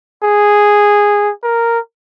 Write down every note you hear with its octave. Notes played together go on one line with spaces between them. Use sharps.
G#4
A#4